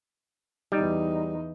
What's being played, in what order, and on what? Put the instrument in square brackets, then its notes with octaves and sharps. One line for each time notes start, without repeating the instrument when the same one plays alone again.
[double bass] E2 D#4 [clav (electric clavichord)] G3